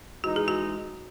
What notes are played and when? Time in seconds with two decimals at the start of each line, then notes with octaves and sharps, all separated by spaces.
0.24 E3 G#3 D#4 F#4
0.36 G#4
0.48 F#4